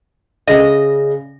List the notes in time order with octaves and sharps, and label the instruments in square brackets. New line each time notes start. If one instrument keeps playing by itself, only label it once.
[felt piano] C#3 [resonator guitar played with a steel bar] D#5